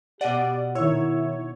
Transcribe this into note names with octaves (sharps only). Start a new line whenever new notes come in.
B2 G4 D5 D#5 F#5
D#3 E4 C#5 E6